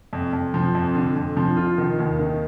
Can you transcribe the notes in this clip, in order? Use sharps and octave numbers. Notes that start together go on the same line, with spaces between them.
F2
F2
F3
F2
D3
F2
F3
F4
D#3
D#2
D#3